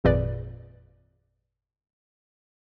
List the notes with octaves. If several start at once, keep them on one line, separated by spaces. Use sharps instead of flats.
G#1 F2 A#2 G#4 B4 D5